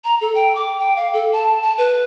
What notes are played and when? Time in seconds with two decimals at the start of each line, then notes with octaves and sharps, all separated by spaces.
0.04 A#5
0.21 A4
0.35 G5
0.55 D6
0.79 G5
0.96 F5
1.13 A4
1.33 A5
1.62 A5
1.78 B4